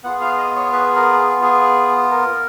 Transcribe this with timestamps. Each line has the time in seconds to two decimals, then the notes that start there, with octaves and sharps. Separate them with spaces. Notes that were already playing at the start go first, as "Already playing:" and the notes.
0.04 B3 F4 G#4 F#5
0.21 F5
0.38 D#5
0.56 C#5
0.72 B4
0.96 A#4
1.19 G#4
1.42 G#4
2.11 A#4